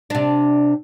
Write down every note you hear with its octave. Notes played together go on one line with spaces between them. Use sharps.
C3 D4